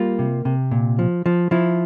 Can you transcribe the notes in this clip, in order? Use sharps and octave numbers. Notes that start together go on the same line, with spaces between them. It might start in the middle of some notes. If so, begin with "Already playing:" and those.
Already playing: G3 A#3 F4
C3
C3
A#2
F3
F3
F3 E4